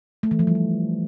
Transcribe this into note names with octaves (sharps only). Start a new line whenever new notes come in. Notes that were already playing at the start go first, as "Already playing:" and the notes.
A3
E3
F3
G3
F3